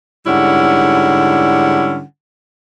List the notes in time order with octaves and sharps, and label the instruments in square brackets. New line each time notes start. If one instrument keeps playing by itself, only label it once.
[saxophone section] G#2 D3 G3 C#4 E4 F#5